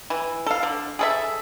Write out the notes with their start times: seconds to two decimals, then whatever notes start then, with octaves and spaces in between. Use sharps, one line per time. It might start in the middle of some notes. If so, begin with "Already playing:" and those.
0.10 E3
0.46 A4 F5
0.63 D3
0.99 G#4 A4 E5